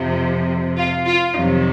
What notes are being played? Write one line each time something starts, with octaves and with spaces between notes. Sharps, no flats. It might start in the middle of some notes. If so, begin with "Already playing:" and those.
Already playing: F2 C3 F3
F4
F4
F2 C3 D#3 F#3 D#4